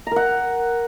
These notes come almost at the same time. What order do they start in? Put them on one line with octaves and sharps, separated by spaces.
A#5 A#4 F#5